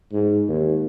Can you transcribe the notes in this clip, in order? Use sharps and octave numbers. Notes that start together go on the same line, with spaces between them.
G#2
D#2